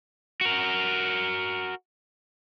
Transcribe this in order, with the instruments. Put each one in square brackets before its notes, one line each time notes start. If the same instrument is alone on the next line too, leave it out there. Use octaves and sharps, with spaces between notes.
[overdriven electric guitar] F#4 A#4